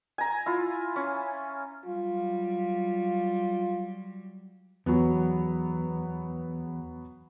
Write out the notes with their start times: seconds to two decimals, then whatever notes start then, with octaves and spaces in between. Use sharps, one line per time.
0.18 G#5 A#5
0.46 E4 F4
0.96 C#4
1.86 F#3 G3 F4
4.86 E2 F#3 B3